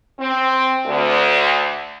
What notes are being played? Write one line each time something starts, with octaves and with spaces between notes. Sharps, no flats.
C4
D2